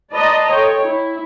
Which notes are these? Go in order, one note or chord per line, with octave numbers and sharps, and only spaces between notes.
B4 D5 D#5 A5 A#5 C6
A4 C#5 G5
E4